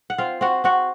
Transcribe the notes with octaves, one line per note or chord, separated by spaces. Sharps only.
F#5
C4 F4 F5
C4 F#4 F#5
C4 F#4 F#5